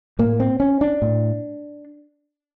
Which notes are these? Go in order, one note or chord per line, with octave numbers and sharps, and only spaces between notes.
A2 A#3
C4
C#4
D4
A2